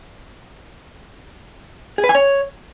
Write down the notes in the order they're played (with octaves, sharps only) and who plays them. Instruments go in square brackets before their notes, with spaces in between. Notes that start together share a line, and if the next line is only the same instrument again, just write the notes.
[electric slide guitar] G#4
B4
G#5
C#5